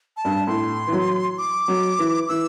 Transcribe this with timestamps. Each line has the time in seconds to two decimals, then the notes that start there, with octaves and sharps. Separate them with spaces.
0.17 A5
0.25 G2
0.47 A2 C6
0.87 E3
0.92 F#3
1.38 D6
1.68 F#3
1.99 E3
2.28 E3 E6